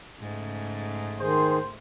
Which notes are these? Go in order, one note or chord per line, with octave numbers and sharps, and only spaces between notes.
G#2 C#3 A3
D#3 G#4 C5